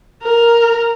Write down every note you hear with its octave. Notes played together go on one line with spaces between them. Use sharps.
A#4